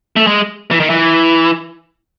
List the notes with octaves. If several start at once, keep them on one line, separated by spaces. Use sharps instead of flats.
A3
G#3
E3
D#3
E3